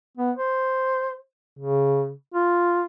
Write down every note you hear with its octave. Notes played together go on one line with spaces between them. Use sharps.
B3
C5
C#3
F4